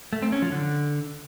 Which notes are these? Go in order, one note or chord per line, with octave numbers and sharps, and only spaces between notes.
A3
C4
C#4
F3
D3